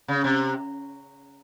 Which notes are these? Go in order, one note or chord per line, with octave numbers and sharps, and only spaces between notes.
C#3
C3